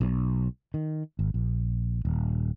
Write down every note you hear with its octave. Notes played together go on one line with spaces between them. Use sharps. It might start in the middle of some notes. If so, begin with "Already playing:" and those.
B1
D#3
G#1
A#1
D#1